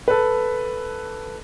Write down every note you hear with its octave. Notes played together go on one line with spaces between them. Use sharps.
A4 B4